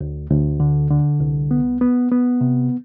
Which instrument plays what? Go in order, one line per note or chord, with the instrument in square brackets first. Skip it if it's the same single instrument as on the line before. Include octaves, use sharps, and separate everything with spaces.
[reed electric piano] D2
D2
D3
D3
C2
B3
B3
B3
C3